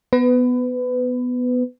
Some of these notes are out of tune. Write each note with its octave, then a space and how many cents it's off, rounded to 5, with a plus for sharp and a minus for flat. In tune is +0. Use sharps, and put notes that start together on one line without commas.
B3 +5 B4 +25